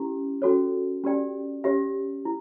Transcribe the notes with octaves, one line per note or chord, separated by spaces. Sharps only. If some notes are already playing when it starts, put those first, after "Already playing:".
Already playing: C#4 E4 G4
C#4 F#4 A4 C#5
C#4 G4 D5 G5
C#4 G4 C#5 E5
E4